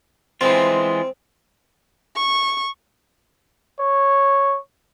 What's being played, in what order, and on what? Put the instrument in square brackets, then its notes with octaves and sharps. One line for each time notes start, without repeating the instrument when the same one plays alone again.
[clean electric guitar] E3 G#3 F4 [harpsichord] C4
[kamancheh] C#6
[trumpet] C#5